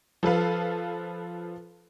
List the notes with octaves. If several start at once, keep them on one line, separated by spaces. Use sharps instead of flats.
F3 A4 B4 F5